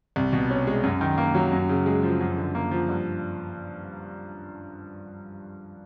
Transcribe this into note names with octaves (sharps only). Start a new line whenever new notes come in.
C2
B2
C#4
G#3
F#2
D#3
A#3
F#3
F#2
C#3
G#3
F3
F#2
D3
A#3
F3
G2